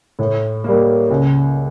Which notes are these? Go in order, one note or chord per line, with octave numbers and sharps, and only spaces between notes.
A2
G3 A#3
C#2